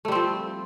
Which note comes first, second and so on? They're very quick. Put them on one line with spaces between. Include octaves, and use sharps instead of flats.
A3 G3 C4 F3